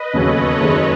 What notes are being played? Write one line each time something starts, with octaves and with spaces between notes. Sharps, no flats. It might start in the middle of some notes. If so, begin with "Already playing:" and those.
Already playing: B4 D#5
E1 D#2 C#3 F#3 A4 C#5
F#1 F#2 D#3 G#3